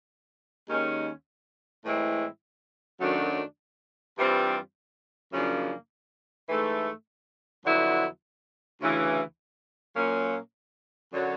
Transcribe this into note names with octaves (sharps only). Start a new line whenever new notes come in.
D#2 D#3 G#3 C#4
A2 E3 G#3 C4 E4
F#2 D#3 F#3 A3 D4
G2 E3 G3 C4 F4
F#2 C#3 F3 A#3 D4
G#2 E3 A3
F2 D3 F#3 B3 E4
D2 C#3 E3
A#2 F#3 A#3 C#4
F#2 D3 F#3